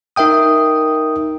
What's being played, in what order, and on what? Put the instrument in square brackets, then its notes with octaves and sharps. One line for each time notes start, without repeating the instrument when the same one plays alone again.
[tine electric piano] D#4 A#4 E5 G5 D#6